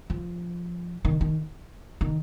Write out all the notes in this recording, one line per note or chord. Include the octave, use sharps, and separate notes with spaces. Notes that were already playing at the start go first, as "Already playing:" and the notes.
F3
D#3
D#3
D#3